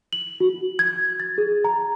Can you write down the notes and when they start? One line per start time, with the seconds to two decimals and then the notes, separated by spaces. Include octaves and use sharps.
0.13 F#7
0.40 F#4
0.79 G#6
1.20 A6
1.38 G#4
1.64 A#5